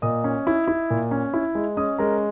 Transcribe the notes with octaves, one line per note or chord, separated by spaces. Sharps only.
A#2 D#5 D#6
C#4
E4
E4
A#2
C#4
E4
G#3
C#4 D#5 D#6
G#3 A#4 A#5